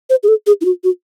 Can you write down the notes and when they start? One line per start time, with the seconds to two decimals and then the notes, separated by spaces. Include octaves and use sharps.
0.10 C5
0.23 G#4
0.28 A4
0.47 G#4
0.61 E4
0.65 F#4
0.84 F#4